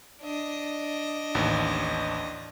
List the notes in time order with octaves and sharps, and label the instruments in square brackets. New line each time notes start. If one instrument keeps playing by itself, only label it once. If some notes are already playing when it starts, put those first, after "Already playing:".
[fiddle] D4 D#5
[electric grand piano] A1 D#2